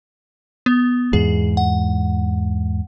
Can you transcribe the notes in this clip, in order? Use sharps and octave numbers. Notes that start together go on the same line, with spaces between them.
B3
E2 G#2 G#4
F#5